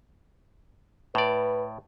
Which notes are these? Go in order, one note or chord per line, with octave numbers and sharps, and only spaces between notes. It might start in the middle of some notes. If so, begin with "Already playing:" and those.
A2 B4 D5